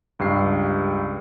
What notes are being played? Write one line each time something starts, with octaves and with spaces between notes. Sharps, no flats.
C#2 G2 G4 C7